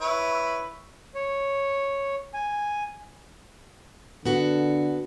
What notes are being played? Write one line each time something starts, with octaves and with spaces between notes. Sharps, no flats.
E4 B4 C#5
C#5
G#5
D3 B3 F#4 A4